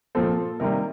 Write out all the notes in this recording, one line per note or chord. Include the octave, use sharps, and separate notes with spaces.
A#2 F3 C4 A4
C3 D#3 G3 A#3 A#4